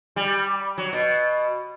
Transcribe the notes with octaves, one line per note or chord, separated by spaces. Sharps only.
G3
F#3
B2